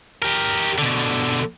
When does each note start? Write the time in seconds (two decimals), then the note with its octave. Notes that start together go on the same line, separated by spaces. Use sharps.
0.22 G4 A#4
0.78 B2 D3